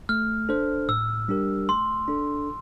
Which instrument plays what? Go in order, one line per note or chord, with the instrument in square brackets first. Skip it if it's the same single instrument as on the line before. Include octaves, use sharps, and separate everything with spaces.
[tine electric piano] A3 [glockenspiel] F6
[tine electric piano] D4 A4 C5
[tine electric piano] A2 [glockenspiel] E6
[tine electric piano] G3 D4 G4 A#4
[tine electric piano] A3 [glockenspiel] C6
[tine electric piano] D4 A4